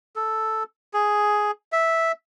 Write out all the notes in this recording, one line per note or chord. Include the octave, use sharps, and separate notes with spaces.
A4
G#4
E5